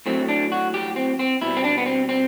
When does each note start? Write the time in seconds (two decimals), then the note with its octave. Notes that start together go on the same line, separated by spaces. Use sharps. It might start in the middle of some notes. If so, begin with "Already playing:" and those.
0.06 A2 F#3 A3 C4
0.29 D4
0.52 F#4
0.74 G4
0.96 C4
1.19 C4
1.41 B2 G3 E4
1.57 C4
1.64 D4
1.78 B3
1.86 C4
2.09 C4